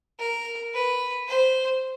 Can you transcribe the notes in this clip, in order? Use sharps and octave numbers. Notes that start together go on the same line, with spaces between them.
A#4
B4
C5